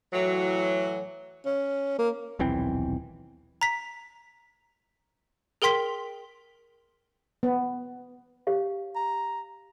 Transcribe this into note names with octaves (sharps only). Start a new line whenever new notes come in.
A2 E3 F#3
C#4
A#3
D#1 B1 E3 C4
A#5 B6
G#4 A#4 G5 C6 B6 G7
B3
G4 C#5 F5
A#5